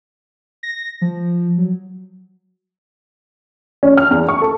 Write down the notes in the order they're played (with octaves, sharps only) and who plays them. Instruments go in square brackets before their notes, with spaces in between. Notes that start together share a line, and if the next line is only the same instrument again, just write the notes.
[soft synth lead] A#6
F3
F#3
[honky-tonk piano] C#4
F6
E2
C#6
A4